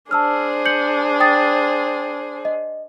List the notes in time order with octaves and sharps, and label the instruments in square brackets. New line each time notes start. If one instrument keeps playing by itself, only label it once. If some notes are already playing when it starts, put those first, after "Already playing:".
[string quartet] D4 G#4 C5 [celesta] A5 E6 F6
[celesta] G6 C#7 F#7
G5 D#6 A6
D#5